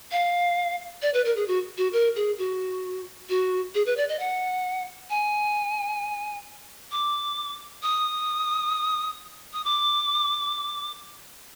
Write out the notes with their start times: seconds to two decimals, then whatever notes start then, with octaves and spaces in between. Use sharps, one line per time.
0.12 F5
1.02 D5
1.14 B4
1.25 A#4
1.36 G#4
1.48 F#4
1.78 F#4
1.93 A#4
2.16 G#4
2.38 F#4
3.29 F#4
3.75 G#4
3.86 B4
3.97 D5
4.09 D#5
4.20 F#5
5.10 G#5
6.92 D6
7.83 D#6
9.53 D#6
9.65 D6